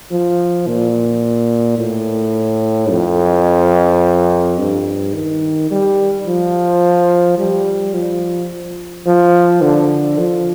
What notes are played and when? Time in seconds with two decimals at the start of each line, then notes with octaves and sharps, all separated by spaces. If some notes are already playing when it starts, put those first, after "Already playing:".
0.11 F3
0.67 A#2
1.79 A2
2.92 F2
4.59 G2
5.14 D#3
5.71 G3
6.27 F3
7.39 G3
7.94 F3
9.07 F3
9.62 D3
10.19 F3